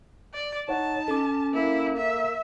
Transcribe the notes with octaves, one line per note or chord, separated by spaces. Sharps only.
D5
D#4 C#5 F#5 A5
C#4 A4 D6
A#3 E4
E5